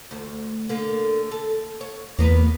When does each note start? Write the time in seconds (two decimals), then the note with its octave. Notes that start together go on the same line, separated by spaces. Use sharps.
0.11 D2
0.69 D3 A#3
1.31 A4
1.81 C#5
2.19 E2 A#3 B3 B4